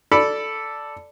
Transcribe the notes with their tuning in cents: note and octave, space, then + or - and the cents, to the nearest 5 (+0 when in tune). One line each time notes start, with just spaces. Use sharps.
A4 +0 D5 +0 B5 +0